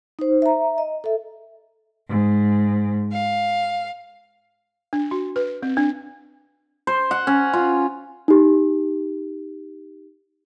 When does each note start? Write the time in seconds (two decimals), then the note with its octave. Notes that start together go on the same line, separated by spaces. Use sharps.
0.19 D#4 C5
0.42 E5 A#5
0.78 D#5
1.04 A4 E5
2.08 G#2
3.13 F5
4.93 D4
5.11 F#4
5.36 B4
5.62 C4
5.77 D4
6.87 C5
7.11 F#5
7.27 C#4
7.53 F4
8.28 D#4 G4